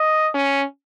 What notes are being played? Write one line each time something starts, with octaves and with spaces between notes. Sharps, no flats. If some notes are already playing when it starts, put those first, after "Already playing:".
Already playing: D#5
C#4